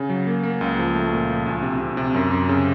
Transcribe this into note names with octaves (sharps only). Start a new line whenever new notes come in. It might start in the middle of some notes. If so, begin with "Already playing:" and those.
Already playing: C#3
F#3
A#3
A#3
C#2
F3
A3
A#2
F3
D2
C3
C3
C3
F#2
F#2
C#3